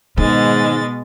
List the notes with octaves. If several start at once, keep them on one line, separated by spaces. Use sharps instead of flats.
G#2 B2 D#3 G#3 A6